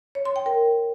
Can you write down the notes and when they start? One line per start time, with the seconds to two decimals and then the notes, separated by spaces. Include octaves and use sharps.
0.15 C#5
0.25 C6
0.36 G5
0.46 A#4